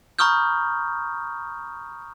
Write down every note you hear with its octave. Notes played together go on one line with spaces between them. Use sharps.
A#5 B5 C#6 D#6 F6 G6